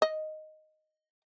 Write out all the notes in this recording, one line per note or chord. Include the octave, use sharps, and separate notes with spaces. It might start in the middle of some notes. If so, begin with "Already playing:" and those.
D#5